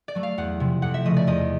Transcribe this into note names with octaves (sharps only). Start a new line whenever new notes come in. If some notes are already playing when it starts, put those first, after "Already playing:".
D5
F#3 A3
F5
E2 F#5
C3 F3
F2 F#5
E5
C#3 F3 A3 D#5
D5
E2 D#5